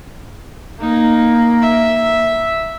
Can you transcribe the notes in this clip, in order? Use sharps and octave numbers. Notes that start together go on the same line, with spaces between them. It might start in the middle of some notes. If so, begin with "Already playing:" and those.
A#3 D#4
E5